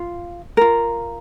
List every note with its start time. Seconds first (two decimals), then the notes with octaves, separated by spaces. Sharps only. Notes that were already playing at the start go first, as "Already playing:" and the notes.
Already playing: F4
0.57 F4 A#4